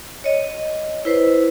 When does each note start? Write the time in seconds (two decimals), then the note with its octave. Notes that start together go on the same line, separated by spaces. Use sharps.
0.24 C#5 D#5
1.05 E4 B4 C5